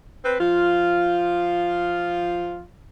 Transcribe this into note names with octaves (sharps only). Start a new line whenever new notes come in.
C4 B4
F3 F4